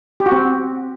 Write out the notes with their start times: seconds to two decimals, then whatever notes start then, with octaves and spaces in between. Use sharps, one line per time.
0.20 G4
0.26 F#4
0.32 C4